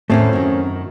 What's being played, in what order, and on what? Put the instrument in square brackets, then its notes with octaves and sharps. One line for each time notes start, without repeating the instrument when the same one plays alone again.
[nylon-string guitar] E2 A2 D#3 [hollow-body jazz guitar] A3 C4 C#4
[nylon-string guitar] F#2 D#3